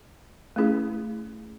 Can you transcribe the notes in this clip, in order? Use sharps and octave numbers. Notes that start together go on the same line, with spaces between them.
A3 C#4 E4 G#4